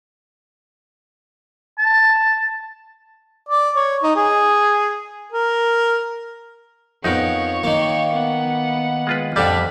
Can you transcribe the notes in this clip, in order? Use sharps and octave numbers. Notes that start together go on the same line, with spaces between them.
A5
D5
C#5
D#4
G#4
A#4
F2 B3 D#4 A#4 C#5
D#3 A#3
B3 F#5
G#3 F4 B4
F2 D3 G3 D4 B6